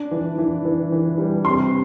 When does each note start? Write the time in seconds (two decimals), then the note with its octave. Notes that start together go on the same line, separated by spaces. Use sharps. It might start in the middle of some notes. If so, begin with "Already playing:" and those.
Already playing: D4
0.11 E3
0.38 E3
0.65 E3
0.92 E3
1.18 G3
1.45 C3 C6